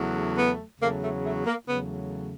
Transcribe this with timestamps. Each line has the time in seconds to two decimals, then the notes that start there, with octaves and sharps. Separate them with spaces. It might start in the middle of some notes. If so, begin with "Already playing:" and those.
Already playing: E2 C#3 F#3 A3
0.36 B3
0.80 E2 C#3 F#3 A3 A#3
1.02 A3
1.24 A3
1.46 A#3
1.68 E2 C#3 F#3 A3 B3